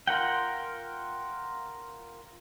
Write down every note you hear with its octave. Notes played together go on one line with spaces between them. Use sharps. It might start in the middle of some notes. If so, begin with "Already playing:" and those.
F4 A#4 F#5 G5